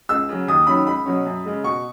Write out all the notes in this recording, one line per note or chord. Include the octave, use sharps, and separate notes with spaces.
C#2 E6
C#3 F#3
D#2 D#6
D#3 F#3 C#4 B5
C#2 B5
B2 F#3 C#4
F#2
C#3 G#3
B2 C#6